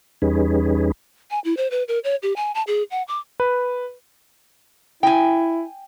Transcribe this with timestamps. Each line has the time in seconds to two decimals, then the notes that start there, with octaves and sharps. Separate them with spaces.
0.22 E2 G3 C#4 D#4 G#4 B4
1.31 G#5
1.45 E4
1.57 C5
1.71 B4
1.88 A#4
2.04 C#5
2.23 G4
2.36 G#5
2.55 A5
2.67 G#4
2.91 F#5
3.08 D6
3.40 B4
5.03 E4 G5 G#5